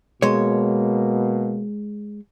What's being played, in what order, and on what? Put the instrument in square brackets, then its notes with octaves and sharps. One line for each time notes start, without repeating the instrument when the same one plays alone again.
[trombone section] B2 A#3 [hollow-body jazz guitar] G#3 C#5